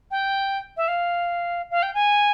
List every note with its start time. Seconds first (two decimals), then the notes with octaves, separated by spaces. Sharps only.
0.11 G5
0.77 E5
0.88 F5
1.71 F5
1.83 G5
1.94 G#5